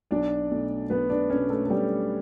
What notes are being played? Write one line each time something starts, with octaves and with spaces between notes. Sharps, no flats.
B1 D4 D5
B2 A3
B1 B3 B4
D4 D5
B2 A3 C#4 C#5
A3 A4
A4
B1 G3 G4